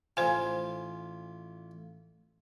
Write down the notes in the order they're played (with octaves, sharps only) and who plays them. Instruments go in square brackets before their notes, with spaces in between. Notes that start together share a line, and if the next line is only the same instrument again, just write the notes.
[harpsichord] A1 F4 [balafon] C5 G#5